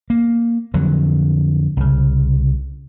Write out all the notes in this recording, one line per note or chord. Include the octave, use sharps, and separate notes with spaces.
A#3
F2 D3 F#3
C2 C#3